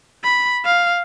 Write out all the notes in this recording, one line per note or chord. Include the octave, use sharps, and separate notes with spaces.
B5
F5